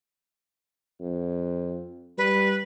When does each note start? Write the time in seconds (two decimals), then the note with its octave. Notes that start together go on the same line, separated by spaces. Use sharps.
1.01 F2
2.18 G3 B4